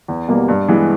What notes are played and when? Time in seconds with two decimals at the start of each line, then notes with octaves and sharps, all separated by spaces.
0.08 E2
0.28 B2 G3 A#3
0.48 G2
0.68 E3 G#3 B3